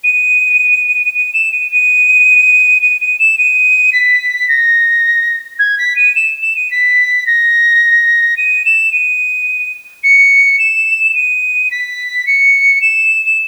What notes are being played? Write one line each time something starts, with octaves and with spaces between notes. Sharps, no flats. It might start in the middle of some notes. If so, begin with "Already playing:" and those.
D#7
D#7
E7
D#7
D#7
D#7
D#7
E7
D#7
B6
A#6
G#6
B6
D#7
E7
E7
D#7
B6
A#6
D#7
E7
D#7
C#7
E7
D#7
B6
C#7
E7
E7